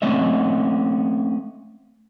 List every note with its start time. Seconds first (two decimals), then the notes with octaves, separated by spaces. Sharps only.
0.02 A3 C4 C#4 D#5 E5